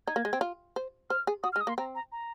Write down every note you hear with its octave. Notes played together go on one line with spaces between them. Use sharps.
D#4 G#6
A#3
G#3
C4
F4
C5
C5 F6
G#4
F#4 D#6
F6
G#3
D#6
A#3 C6
C4 A#5
A#5
A#5